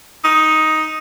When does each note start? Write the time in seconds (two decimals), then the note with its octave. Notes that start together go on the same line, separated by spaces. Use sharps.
0.24 D#4